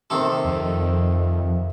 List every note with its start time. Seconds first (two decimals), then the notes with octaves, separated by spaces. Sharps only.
0.10 C3 D#3 A4
0.44 F2